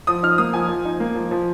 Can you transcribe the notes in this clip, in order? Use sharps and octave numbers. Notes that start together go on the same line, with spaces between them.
F3 D#6
D#4 F6
A#3 D#6
F3 G#5
F3
D#4
A#3
F3
F3